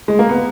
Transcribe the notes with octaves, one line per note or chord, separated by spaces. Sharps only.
G#3
A#3
B3